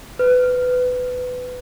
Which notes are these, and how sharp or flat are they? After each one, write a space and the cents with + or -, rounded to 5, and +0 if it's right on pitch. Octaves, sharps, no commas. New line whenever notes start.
B4 +20